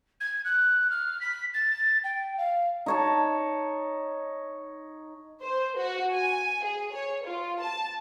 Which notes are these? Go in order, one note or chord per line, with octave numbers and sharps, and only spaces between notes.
G#6
F#6
F6
B6
A6
G5
F5
D#4 C#5 A5
C5
F#4
G#5
G#4
C#5
F4
A5